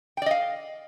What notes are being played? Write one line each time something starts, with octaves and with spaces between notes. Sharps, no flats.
D5 D#5 F5 G5